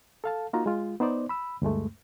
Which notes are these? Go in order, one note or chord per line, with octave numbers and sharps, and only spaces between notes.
A4 F5 A5
A#3 D#4 F4 F#4 A#5
G#3 F4
B3 D#4 C5 D5
B5 E6
D2 G2 G#3 A3